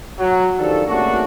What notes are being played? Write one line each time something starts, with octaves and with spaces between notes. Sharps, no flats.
F#3
D#3 F3 D4 G4 A4
G#1 A3 A#3 C#4 D4 F#4